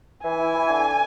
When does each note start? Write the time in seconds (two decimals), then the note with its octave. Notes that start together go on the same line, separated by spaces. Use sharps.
0.24 E3 G#5
0.39 E4
0.54 E3
0.70 D3